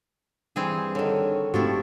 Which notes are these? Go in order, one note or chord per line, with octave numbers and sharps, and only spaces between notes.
G2 E3 C4 G#4
D3 D#3 C#5
F1 G#2 F3 D4 E4 F#4 G4 C#6